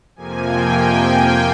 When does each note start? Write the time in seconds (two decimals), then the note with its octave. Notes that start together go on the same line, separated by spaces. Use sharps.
0.16 F2 C3 F3 A#3 G#5
0.46 G5